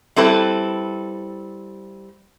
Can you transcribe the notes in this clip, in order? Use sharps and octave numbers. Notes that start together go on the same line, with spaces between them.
G3 C4 E4 A4 B4